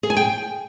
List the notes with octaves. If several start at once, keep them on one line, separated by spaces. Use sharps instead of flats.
G#4
G#5
G5